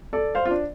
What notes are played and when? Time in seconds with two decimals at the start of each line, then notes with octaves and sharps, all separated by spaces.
0.13 A4 D5
0.35 C5 F5
0.45 F4
0.51 D4